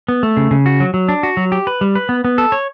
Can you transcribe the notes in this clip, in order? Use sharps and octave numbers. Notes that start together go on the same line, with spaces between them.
B3
A3
C#3
C#3
F#4
F#3
F#3
D4
F#4
F#3
G4
B4
G3
B4
B3
B3
A4
C#5